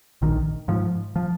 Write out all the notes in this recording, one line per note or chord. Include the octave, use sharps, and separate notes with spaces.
A#1 D#3
G#2 F3
F3